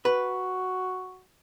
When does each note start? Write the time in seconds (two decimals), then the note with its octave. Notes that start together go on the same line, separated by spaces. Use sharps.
0.05 F#4 B4